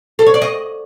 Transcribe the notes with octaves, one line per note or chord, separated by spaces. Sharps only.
A4
C#5
D5
D#5